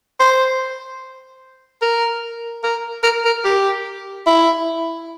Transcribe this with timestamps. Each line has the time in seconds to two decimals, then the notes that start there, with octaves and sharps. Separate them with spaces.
0.20 C5
1.82 A#4
2.63 A#4
3.03 A#4
3.25 A#4
3.45 G4
4.26 E4